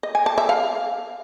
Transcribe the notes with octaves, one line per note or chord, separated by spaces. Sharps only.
D#5
G#5
A5
E5
F5